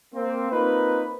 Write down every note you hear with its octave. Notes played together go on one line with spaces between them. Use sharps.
A#3 C4
A#3 C4 D#4 F4 B4